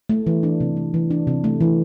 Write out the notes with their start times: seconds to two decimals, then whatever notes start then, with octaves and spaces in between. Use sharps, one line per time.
0.09 A3
0.27 E3
0.43 D4
0.60 C3
0.77 A3
0.94 E3
1.11 D4
1.27 C3
1.44 A3
1.61 E3